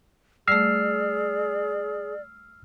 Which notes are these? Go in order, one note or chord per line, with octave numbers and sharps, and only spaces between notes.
G3 A3 G#4 D5 E6 F6 C7